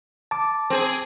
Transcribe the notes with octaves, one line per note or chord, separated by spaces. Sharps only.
A5 D6
C4 G#4